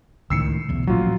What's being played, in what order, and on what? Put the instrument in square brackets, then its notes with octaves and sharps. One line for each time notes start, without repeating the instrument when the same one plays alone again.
[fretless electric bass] C#2 A2 D#3 [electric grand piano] E6 C7 C#7
[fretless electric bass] B1 E2
[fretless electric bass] A1 A#2 F3 [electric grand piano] F#3 F4